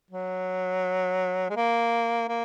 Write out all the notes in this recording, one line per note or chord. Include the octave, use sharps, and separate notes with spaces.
F#3
G#3
A#3
A#3